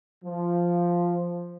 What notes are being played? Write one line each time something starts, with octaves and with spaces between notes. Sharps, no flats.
F3